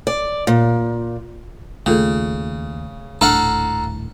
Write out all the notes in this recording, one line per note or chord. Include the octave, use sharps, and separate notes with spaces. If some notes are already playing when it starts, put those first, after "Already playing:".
D5
A#2
D#2 C#3 A3 F4 A4
D#1 A2 D4 A4 F5 F#5 A#5